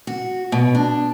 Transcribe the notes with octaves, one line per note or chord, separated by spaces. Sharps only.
F#4
B2
D4